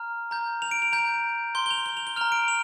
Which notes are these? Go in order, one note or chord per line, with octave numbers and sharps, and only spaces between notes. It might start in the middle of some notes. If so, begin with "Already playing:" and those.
Already playing: A#5 F6
A#5 G6
F7
D7
F7
A#5 G6 F7
C6 G6 G7
G7
F7
G7
F7
G7
A#5 F6 F7
D7
F7